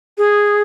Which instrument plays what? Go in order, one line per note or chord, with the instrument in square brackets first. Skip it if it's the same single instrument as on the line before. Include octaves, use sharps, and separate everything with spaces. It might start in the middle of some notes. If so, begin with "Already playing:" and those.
[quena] G#4